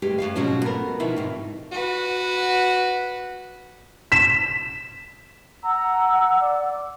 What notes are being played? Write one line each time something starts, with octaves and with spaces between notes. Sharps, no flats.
D2 G2 G#3 G4
F#2 B2 F5
G#2 B2 F3 F#3 C#4
B3 A4 A#4
B2 D#3 F3 E4
G#2 C3 D#3
F#4 B4
B6 E7
F#5 A#5 E6
D5